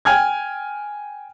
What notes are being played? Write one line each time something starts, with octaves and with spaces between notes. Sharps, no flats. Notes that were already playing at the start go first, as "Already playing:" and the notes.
G5 G#5 F6 G#6